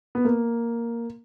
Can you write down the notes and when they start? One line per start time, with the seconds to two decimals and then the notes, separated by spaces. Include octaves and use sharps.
0.15 B3
0.25 A#3